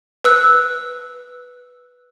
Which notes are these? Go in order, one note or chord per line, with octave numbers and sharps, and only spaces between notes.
B4 E6 F#6